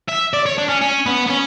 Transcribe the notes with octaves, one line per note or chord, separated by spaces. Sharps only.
E5
D5
C#5
D4
C#4
C#4
B3
B3
C#4